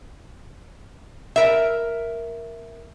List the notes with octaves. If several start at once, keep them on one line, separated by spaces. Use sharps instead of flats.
A#4 E5